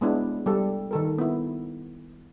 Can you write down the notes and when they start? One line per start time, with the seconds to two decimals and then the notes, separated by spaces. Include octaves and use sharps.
0.01 G#3 B3 D4 E4
0.46 G3 A4
0.91 D#3 A4 A#4
1.19 B3 E4